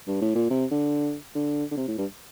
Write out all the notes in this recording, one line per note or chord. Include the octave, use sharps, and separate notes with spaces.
G2
A2
A#2
C3
D3
D3
D3
C3
A2
G2